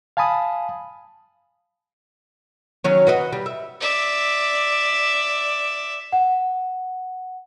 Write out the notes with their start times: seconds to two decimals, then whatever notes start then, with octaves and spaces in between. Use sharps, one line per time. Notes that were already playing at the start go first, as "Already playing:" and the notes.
0.17 F5 G#5 A5 B5 D#6
2.84 D#3 F#3 C#4
3.07 F#4 B4 D#5
3.32 G3
3.46 E5
3.81 D5 E5
6.12 F#5